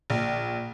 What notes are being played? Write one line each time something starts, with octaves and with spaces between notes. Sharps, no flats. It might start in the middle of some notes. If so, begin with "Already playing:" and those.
A#1